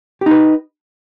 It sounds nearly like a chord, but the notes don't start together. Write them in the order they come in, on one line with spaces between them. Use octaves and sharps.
G4 D#4 B4